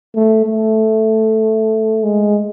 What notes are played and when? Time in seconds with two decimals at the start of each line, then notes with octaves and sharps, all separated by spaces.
0.15 A3
0.46 A3
2.03 G#3